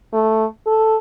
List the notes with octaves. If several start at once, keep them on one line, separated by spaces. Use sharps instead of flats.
A3
A4